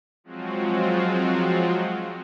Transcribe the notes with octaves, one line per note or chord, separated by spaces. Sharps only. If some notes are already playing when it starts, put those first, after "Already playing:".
F3 F#3 G#3 C4 F4 F#4